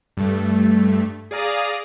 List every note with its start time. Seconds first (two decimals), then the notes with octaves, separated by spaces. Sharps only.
0.17 G2 A3
1.31 G#4 D5 F5 A#5 D#6